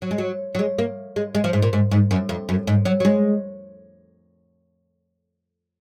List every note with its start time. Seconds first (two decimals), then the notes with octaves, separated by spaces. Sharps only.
0.02 F#3
0.11 G#3
0.18 F#3
0.55 F#3
0.59 G#3
0.79 A#3
1.16 G#3
1.35 G#3
1.44 F3
1.53 G#2
1.62 A#2
1.73 G#2
1.91 G#2
2.11 F#2
2.29 F2
2.49 F#2
2.67 G#2
2.85 F#3
3.00 F#3
3.05 G#3